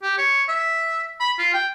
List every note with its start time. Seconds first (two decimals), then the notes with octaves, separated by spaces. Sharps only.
0.03 G4
0.18 C#5
0.49 E5
1.20 B5
1.39 F4
1.54 G5